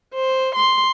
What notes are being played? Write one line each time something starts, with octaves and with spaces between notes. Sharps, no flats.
C5
C6